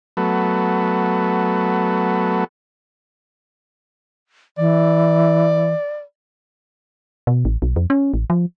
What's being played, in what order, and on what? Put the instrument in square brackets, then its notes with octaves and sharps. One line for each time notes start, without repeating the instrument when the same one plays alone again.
[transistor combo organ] F#3 A3 B3
[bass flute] E3 [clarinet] D5
[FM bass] B2
A1
B1
F2
C#4
A1
F3